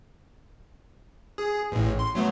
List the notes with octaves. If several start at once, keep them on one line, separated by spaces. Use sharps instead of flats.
G#4
A1 A2
C6
F#3 A3 B3